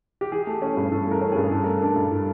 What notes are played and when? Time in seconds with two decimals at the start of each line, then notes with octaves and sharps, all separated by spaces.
0.21 G4
0.32 E3 G#4
0.47 A3
0.62 C#4
0.77 G2
0.92 E3 A4
1.07 A3 A#4
1.21 C#4
1.32 G2 G#4
1.52 E3 A4
1.64 A3 A#4
1.77 D4 A4
1.96 G2
2.11 E3